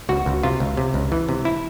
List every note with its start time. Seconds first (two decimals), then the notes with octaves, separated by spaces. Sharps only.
0.09 C#2 F#4
0.26 C#2
0.43 C3 F4
0.60 C#2
0.77 C3
0.94 C#2
1.12 E3
1.29 C3
1.45 E4